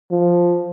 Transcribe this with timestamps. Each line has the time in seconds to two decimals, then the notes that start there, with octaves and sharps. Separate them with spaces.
0.11 F3